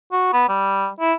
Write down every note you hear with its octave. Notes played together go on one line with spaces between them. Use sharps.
F#4
B3
G3
E4